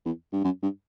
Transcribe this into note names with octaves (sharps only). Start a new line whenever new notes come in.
E2
G2
F#2
G2